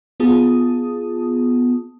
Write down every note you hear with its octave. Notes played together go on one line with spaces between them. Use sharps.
B3 F4 G#4 A5 D#6